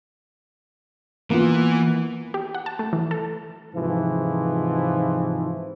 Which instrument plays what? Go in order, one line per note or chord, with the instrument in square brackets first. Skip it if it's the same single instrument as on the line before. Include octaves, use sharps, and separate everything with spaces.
[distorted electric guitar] E3 [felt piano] A#3 B3 F4
[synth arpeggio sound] G4
F#5
A5
A3
E3
A4
[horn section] G#2 C3 E3 F3